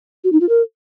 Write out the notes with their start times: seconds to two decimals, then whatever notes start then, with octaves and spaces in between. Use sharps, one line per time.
0.24 F#4
0.32 D#4
0.41 F4
0.49 A#4